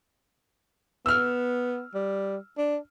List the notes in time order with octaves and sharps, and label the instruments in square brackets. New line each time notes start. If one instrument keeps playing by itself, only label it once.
[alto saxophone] B3 [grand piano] E6 F6
[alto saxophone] G3
D4